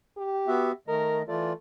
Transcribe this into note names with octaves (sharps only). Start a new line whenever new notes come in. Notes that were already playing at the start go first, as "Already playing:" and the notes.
G4
B3 F#4 E5
D#3 A3 A#4 D#5
E3 A3 F4 D5